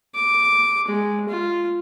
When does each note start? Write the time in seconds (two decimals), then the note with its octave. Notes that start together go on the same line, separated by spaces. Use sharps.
0.14 D6
0.88 G#3
1.29 F4